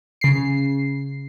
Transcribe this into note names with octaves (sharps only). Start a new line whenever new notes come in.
C#3 C7